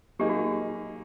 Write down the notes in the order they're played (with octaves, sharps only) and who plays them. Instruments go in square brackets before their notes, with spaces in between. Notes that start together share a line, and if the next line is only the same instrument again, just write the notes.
[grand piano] F#3 A#3 D#4 G#4 [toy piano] G4
[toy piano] F#4
F#4